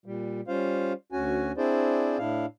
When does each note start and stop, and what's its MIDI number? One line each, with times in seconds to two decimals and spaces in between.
0.06 0.41 46
0.06 0.41 55
0.48 0.93 55
0.48 0.93 61
0.48 0.93 65
0.48 0.93 72
0.48 0.93 77
1.12 1.52 38
1.12 1.52 61
1.12 1.52 66
1.12 1.52 80
1.57 2.18 60
1.57 2.18 62
1.57 2.18 64
1.57 2.18 68
1.57 2.18 72
1.57 2.18 74
2.18 2.46 45
2.18 2.46 62
2.18 2.46 64
2.18 2.46 77